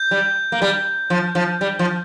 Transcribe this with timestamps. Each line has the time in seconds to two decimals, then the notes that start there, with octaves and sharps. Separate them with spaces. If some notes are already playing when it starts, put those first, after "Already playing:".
Already playing: G6
0.11 G3
0.52 A#3
0.62 G3
1.10 F3
1.35 F3
1.61 G3
1.79 F3